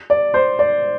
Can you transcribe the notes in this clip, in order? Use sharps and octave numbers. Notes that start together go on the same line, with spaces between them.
D5
C5
D5